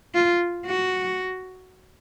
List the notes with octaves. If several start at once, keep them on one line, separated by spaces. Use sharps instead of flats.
F4
F#4